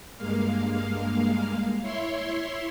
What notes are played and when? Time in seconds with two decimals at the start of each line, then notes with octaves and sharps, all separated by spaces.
0.17 G2 G#3 A#3 F5
1.81 E4 C#5 E5 C6